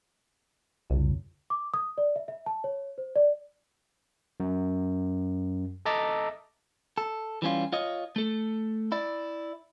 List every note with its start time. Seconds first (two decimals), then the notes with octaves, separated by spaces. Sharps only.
0.90 C2 F2 C#3
1.50 D6
1.74 D#6
1.98 D5
2.16 E5
2.28 E5
2.46 A5
2.64 C#5
2.98 C5
3.16 D5
4.40 F#2
5.86 A4 D#5 E5 A5 A#5 D6
6.98 A4
7.42 E3 G3 C#4 F4
7.73 F4 C#5 D#5
8.16 A3 A4
8.92 E4 D5